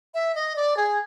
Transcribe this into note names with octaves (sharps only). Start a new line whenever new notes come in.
E5
D#5
D5
G#4